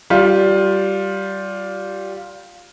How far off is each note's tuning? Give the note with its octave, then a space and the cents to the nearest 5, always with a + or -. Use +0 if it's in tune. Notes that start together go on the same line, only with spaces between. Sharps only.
G3 -15 F4 +10